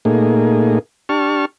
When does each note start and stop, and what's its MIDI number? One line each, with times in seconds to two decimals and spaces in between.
0.05 0.79 46
0.05 0.79 57
0.05 0.79 58
0.05 0.79 63
0.05 0.79 68
1.09 1.45 62
1.09 1.45 67
1.09 1.45 81
1.09 1.45 85
1.09 1.45 89